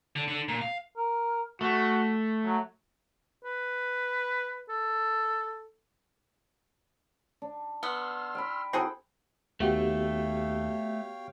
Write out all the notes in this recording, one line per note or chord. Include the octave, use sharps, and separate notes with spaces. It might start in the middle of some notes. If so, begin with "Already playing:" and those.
D3
D3
A#2
F5
A#4
A3 F#4
F#3
B4
A4
D4
B3 C6 E6 F6
G5 B5
C4 D#4 E4 F#4 G#4 A4 F#5 G5
D#2 A3 B3 F#4 G4 C#5 F5 G5